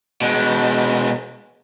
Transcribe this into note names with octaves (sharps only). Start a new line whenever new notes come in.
B2 G#3